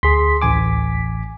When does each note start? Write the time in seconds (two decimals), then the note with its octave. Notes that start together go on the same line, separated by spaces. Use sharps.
0.03 D2 G#4 C6 B6
0.42 A1 G#5 D6